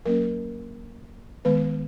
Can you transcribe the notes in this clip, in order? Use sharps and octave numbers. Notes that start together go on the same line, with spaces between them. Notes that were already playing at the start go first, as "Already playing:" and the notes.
F#3 A#3 C#4 A#4
D#3 G#3 B3 B4